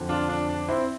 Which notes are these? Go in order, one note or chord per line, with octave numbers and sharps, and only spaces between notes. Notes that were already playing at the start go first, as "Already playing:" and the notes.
Already playing: F2 D3 F3
D4 F4
D4
D4
C4 E4